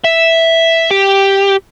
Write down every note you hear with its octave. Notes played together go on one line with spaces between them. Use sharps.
E5
G4